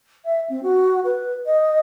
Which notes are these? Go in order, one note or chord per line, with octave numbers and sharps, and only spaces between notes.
E5
C4
F#4
B4
D#5